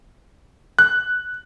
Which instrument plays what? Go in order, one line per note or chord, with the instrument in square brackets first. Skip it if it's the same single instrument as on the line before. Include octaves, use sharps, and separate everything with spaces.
[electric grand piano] F#6